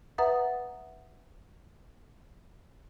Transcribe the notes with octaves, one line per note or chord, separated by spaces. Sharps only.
B4 E5 F#5 A#5 D#6 A6